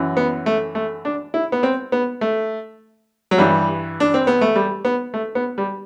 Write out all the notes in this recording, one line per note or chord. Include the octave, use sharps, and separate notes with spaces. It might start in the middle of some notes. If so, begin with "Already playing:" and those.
Already playing: F#2 E3
B3
A3
A3
D4
E4
B3
C4
B3
A3
F#3
G2 E3 G3
D4
C4
B3
A3
G3
B3
A3
B3
G3